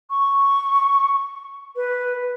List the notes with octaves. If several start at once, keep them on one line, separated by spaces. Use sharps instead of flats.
C#6
B4